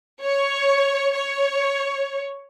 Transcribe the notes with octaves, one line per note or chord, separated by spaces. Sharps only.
C#5
C#5